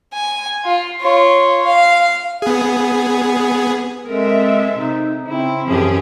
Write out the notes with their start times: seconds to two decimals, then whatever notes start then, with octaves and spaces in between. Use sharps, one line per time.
0.13 G#5
0.64 F4
1.01 F4 C#5
1.65 F5
2.42 B3 G#4
4.06 G#3 C4 A4 A#4 E5
4.74 C3 D#4
5.27 C#3 C4 E4
5.67 F#2 E3 F3 C#4 G4 G#4